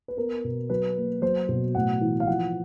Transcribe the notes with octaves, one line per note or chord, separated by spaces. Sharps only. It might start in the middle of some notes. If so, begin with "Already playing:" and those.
B4
B3 A#4
B2
F#3 B4
A#3
F#3 C5
B2
A2 F#5
E3
F5
F3 F#5